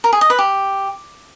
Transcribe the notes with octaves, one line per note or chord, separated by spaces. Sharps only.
A#4
G#4
D#5
B4
G4